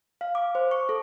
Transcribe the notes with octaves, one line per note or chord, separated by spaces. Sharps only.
F5
D6
C5
C#6
A4